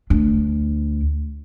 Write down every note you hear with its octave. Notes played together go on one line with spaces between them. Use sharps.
D2 D4